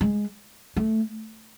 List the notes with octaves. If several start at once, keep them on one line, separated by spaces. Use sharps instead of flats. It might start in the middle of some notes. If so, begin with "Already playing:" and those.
G#3
A3